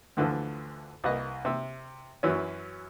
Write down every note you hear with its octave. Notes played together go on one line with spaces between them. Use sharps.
D2 D3 E3 F3
C2 A#3 B4 D#5
C3 E6
F#2 E3 F#3 C#4